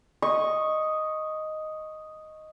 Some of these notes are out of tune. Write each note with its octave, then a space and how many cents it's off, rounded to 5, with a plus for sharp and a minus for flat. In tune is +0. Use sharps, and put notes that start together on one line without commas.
D#5 +0 C#6 -10